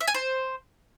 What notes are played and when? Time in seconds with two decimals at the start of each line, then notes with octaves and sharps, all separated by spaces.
0.01 E5
0.07 G#5
0.14 C5